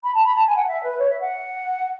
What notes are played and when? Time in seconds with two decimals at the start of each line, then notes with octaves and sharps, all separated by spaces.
0.03 B5
0.14 A5
0.24 B5
0.35 A5
0.46 G#5
0.56 F#5
0.67 E5
0.83 B4
0.99 C#5
1.09 E5
1.20 F#5